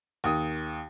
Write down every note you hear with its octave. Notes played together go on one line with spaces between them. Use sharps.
D#2 D#6